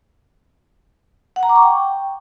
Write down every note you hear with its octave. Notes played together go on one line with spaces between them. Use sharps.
F#5
A#5
D6
C#6
G5